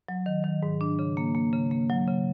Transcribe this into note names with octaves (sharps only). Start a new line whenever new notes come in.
F#3
D#3
D#3
G#2
D4
C#3
A#3
A#3
C#3
A#3
F#3
C#3